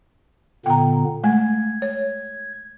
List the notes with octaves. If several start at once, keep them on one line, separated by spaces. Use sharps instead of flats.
A#2 D3 B3 G5 A#5
G#3 A3 G#5 G#6
C#5